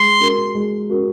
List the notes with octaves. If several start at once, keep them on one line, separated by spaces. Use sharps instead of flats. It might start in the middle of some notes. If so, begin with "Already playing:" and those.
Already playing: G#3 C6
C#4 F#4 A#4
G#3
C#4 F#4 A#4